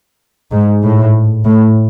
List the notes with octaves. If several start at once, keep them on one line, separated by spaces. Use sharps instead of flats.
G#2
A2
A2